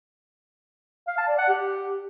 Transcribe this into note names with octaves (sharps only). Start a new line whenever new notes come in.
F5
A5
D5
F#5
G4